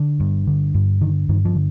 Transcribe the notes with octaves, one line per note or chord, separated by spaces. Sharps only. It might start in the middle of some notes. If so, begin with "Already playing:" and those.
Already playing: D3
G2
D3
G2
D3 D#3
G2 D#3
F3
D3